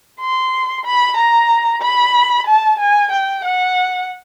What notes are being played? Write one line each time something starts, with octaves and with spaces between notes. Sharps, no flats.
C6
B5
A#5
B5
A5
G#5
G5
F#5